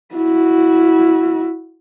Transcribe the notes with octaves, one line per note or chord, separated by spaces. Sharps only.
E4 F#4